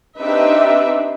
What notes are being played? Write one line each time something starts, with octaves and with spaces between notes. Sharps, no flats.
C4 D4 D#4 G4 B4 E5